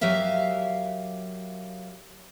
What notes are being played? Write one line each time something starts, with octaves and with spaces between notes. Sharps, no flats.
F#3 G4 A#4 E5 F5